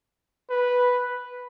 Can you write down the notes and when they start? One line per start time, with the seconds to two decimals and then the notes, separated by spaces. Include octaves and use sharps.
0.50 B4